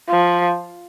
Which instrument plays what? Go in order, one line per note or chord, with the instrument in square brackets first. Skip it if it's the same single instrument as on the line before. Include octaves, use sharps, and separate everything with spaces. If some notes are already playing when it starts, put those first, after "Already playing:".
[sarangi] F3